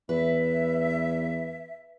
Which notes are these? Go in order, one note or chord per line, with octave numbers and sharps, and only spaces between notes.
E2 B4 E5